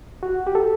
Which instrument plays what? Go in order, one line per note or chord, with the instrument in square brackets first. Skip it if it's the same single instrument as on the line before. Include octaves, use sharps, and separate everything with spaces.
[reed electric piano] F#4
G4
A4